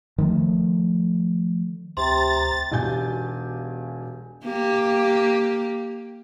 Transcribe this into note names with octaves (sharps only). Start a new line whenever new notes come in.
D#3 F3 A3
D2 C3 A#5 C6 A6
E1 B1 G4 G#5 G6
A#3 G4